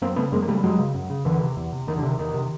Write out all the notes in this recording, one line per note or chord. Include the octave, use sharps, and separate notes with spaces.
F#2 A#3 C4
C#3 A3 B3
F#2 G#3 A#3
A#3
C#3 G3 A3
G3
F#2 F#3 G#3
C#3
F#2
C#3
E2 D3 E3
C3
E2
C3
E2 D#3
D3
C3
D#3
E2 D#3
C3